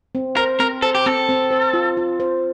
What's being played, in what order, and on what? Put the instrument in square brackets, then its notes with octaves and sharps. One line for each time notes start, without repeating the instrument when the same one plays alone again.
[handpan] C4
[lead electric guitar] A#4 [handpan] C5
[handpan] C4 [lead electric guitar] A#4
[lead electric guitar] A4 [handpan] C5
[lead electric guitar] G4
[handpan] C4 [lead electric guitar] A4
[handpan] C4
C5
F4
F4
C5